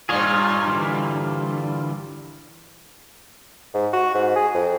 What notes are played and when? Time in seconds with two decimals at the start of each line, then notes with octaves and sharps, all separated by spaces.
0.09 G2 A#2 F4 G#4 C#5 D#5
0.68 D3 E3 G3
3.74 G#2
3.93 F#4
4.14 G#2
4.36 G#4
4.54 F2